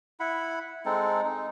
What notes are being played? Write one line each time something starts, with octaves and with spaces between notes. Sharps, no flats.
E4 F#5 B5
G#3 C4 D#4 A4
D#4